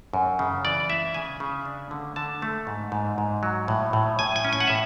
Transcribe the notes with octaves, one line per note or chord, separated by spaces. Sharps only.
F#2
C#3
E3 D5
E4 E5
C#3 G#5
C#3
D4
D3
D3 A5
A3
G#2
G#2
G#2
F#3
A2
A2
A2 G#5
G#5
C#4
G#5
F#5
A2 E5